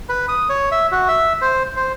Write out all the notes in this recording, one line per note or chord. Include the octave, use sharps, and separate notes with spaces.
B4
D#6
C#5
E5
F#4
E5
C5
C5